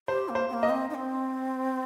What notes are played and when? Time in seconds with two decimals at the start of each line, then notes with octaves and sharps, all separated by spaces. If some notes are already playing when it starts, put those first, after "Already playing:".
0.08 G4 C5
0.29 A#3
0.35 C5
0.49 C4
0.53 A#3
0.63 D#5
0.69 C4
0.90 D#4
0.94 C4